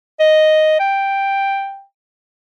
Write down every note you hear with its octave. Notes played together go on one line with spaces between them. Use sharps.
D#5
G5